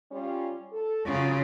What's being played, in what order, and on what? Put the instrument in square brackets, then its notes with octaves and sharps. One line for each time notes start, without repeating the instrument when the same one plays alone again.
[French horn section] G3 C#4 F4
A4
[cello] C#3 F4 [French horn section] F#3 C#4